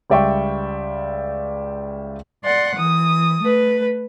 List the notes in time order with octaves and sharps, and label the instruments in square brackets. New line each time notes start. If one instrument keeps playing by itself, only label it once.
[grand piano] C#2 G3 D5 E5 G5 C#6
[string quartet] D5 F#5 C6
E3 D#6
A3 B4